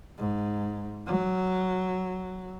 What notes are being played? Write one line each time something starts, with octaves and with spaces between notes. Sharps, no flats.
G#2
F#3